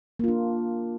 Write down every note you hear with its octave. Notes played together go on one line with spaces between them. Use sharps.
A#3 D4 F4